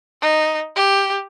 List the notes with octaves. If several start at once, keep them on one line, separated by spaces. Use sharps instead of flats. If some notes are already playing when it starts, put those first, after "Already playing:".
D#4
G4